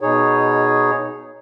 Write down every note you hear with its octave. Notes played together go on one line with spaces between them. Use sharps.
B2 D#4 G#4 C#5